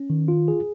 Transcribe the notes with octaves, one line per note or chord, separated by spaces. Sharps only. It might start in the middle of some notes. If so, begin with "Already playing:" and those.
Already playing: C#4
D#3
F4
G#4